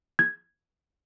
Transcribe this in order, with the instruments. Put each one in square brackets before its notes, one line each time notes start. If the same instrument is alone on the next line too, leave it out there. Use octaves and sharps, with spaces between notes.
[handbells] G#6